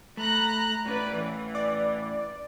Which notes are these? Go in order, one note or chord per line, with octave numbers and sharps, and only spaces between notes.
A3 A#5 B5 F#6
A2 C#4 B4 D5
E3
D5